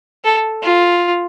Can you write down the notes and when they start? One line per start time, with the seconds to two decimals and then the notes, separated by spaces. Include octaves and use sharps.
0.25 A4
0.63 F4